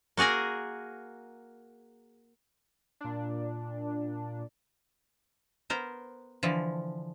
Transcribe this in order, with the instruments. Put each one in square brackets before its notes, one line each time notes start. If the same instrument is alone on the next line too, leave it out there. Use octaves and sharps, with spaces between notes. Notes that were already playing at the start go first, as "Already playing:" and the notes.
[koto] A#3 F#4 G#4 A#4 G#5
[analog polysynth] A#2 D4
[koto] B3 A#4 C5
D3 E3 F3